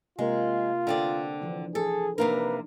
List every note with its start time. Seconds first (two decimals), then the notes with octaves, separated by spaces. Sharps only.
0.19 C3 G#3 A#3 F4 A#4
0.87 D3 C4 D5
1.42 E3 F3 D4
1.75 G#4 A4
2.18 C3 A#3 D4 D#4 A#4 B4